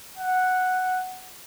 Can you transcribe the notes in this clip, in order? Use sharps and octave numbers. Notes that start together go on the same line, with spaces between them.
F#5